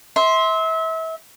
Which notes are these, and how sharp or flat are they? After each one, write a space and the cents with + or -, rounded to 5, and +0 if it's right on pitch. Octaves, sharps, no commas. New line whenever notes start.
E5 -30 C6 +0